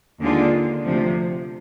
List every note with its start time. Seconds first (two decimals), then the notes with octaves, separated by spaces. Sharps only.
0.20 D#2 D3 G#3 D4 F4
0.85 D2 C3 F3